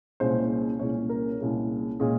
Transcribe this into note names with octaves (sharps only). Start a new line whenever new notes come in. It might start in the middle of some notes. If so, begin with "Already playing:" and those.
C2 A#2 G#3 C#4 C5
C2 A#2 G#3 C#4 C#5
A#4
C2 A#2 G#3 C#4
A#2 G#3 C#4 G#4